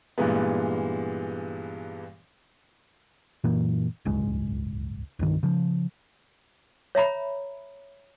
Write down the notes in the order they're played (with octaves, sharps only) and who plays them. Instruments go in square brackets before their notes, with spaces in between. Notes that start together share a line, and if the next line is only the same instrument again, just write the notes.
[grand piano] G2 A#2 E3 G#3 B3
[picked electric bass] F#2 A#2 E3 A#3
D1 G1 C#2 G#3
C2 G2 D#3
C#3 F3
[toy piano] C#5 E5 A#5 B5